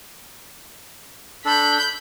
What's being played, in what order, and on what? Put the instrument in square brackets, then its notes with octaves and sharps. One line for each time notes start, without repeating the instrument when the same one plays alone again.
[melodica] D4 A4 [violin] B5 G6